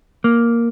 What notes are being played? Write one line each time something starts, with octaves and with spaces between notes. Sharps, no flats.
A#3